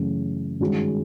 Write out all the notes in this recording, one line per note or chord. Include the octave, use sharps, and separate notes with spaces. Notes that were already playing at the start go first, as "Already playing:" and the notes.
Already playing: F#2 C#3 E3 A3
G2 D#3 G#3 C#4 F#4